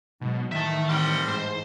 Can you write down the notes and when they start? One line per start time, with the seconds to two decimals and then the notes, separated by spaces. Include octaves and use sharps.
0.21 G#2 B2 F#3
0.52 A2 D#3 E3 E5 A5
0.89 G3 C4 F#5 G5 F6
1.28 G#2 C5